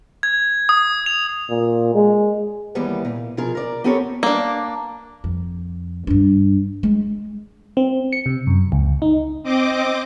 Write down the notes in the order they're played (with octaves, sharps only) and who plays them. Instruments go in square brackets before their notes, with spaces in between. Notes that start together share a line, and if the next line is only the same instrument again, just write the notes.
[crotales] G#6
D#6
F7
[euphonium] A#2
G#3
[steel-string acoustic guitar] D#2 E3 G3 A#3 B3
A#2
B2 F3 F4 G#4 A#4
A#4 D5
B3 C4 G4 A4 A#4 C#5
[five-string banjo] A#3 D4
[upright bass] F2
G2 D4
G#3
[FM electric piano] C4
C#7
C3
F#2
C#2
D#4
[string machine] C4 D#5 D6